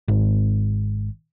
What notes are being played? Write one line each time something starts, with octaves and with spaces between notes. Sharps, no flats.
G#1